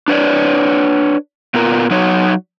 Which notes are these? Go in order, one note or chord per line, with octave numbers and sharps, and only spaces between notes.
D4 B4 C#5 D5
A#2 B3 F4 A#4
F#3 D#4 F#4 C#5